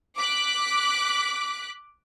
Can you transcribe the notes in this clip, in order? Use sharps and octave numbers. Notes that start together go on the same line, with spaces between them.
D6 F#6 B6